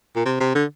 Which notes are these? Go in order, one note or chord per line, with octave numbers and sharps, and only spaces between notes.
A#2
C3
C3
D3